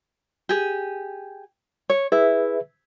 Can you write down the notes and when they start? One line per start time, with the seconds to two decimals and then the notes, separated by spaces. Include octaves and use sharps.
0.49 G4 G#4
1.90 C#5
2.12 E4 G#4 B4 E5